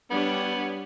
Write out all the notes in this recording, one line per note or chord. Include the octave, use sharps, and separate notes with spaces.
G3 B3 D4 C#5